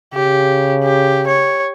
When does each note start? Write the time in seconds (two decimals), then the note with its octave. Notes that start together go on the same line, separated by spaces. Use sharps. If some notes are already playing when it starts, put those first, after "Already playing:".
0.14 C#3 G4
0.83 G4
1.27 C#5